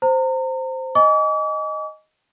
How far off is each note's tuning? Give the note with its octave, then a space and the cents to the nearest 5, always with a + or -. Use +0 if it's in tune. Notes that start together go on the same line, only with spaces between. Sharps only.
C5 -5 A#5 -35
D#5 +0 G#5 +0 D6 -45